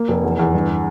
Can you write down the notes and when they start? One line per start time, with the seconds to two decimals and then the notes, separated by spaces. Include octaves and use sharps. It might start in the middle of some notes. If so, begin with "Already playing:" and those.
Already playing: A#3
0.08 F1
0.23 E2
0.39 E2
0.54 G1